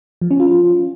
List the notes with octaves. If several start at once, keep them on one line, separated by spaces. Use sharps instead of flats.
F3
C#4
F4